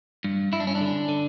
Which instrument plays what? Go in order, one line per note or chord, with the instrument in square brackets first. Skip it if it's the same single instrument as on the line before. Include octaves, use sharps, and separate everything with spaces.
[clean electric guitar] G2
G2 E4
D4
C#4
D4
D3
D3